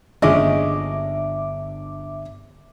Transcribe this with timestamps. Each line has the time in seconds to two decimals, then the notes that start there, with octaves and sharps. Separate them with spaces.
0.22 G1 A#2 G#3 C#4 D4 D#5 E5 D6